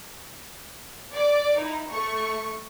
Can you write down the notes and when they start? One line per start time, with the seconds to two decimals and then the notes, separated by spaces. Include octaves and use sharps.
1.12 D5 D6
1.57 D#4 E4
1.89 A3 C#6